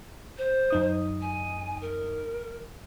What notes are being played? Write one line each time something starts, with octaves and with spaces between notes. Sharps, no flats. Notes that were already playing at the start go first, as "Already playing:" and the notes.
C5
F#2 D#4 D#6
G#5
A#4